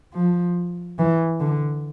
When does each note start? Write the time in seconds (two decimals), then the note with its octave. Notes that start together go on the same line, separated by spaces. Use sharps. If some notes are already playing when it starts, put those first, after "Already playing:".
0.14 F3
0.99 E3
1.40 D3